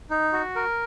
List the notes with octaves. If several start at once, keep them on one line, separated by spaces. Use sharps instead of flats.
D#4
F#4
A#4